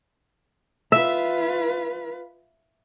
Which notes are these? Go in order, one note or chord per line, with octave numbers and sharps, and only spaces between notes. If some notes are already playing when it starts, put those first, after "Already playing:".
F4 B4 E5